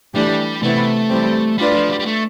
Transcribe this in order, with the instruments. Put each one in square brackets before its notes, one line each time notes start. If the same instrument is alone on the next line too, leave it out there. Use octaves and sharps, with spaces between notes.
[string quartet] E3 A3 D4 G4 D5 [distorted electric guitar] G3
[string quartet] C3 E3 B3 E4 [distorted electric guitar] A3
[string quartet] E3 G3 C4 G4
[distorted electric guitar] G3 [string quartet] A3 D4 F4 B4 D5
[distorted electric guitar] F3
G3
G3
A3